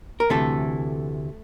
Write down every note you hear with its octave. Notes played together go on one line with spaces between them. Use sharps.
A#4
D2 C3 E3 A3 A4